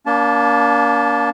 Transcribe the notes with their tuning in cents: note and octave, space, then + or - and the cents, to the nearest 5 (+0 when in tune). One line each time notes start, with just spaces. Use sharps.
A#3 +15 D4 -40 A5 -15